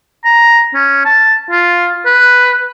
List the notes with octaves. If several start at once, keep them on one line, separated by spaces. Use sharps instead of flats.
A#5
C#4
A5
F4
B4